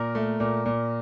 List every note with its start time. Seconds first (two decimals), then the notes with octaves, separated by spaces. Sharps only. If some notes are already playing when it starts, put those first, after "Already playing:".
Already playing: A#2 A#4
0.15 A3
0.40 A#2
0.65 A#2